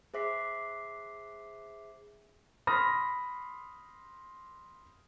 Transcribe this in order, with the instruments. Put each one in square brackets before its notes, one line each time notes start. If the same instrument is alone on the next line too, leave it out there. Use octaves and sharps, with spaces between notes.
[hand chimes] G#4 C5 E5 D6 B6 C7
[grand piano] B5 C6 D#6 F6 A#6